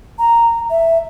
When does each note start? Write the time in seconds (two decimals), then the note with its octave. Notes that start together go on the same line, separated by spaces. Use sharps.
0.19 A#5
0.70 E5